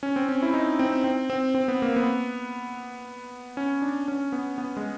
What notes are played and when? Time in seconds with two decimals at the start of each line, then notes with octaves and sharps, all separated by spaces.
0.03 C#4
0.16 C4
0.29 C#4
0.42 E4
0.53 D#4
0.79 C4
1.04 C4
1.30 C4
1.55 C4
1.68 B3
1.82 A#3
1.96 B3
3.57 C#4
3.82 D4
4.08 C#4
4.32 B3
4.58 B3
4.77 G#3